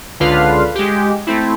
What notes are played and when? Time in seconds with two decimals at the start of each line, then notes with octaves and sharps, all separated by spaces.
0.20 C#2 D3 F4 B4 F5
0.75 G#3 G4
1.27 A3 C4 E4